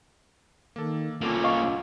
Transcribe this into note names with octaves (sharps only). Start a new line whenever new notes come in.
D#3 A#3 A4
C2 A#3 C#4 F4 A4 D6
D#5 F5 C#6